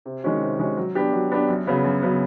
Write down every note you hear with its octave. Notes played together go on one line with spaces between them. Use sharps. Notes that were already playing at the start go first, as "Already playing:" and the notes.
C3
D#3 G#3 C#4 F#4
C3
D#3 G#3 C#4 F#4
F#3
B3 D4 G4
F#3
B3 D4 G4
F#2
C#3 F#3 B3
F#2
C#3 F#3 B3